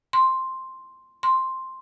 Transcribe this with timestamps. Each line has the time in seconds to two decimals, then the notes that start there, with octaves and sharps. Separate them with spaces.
0.13 C6
1.23 C6